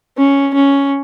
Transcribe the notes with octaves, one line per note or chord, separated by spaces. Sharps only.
C#4
C#4